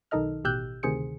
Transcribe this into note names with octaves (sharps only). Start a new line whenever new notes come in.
B1 D#3 D#4 A4 D#5 F6
A1 B2 G4 E6 F#6 G6
D2 C3 D#3 G#4 C5 C#7